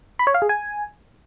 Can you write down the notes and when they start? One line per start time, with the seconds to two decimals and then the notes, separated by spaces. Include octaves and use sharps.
0.19 B5
0.27 C#5
0.34 F5
0.42 G#4
0.49 G#5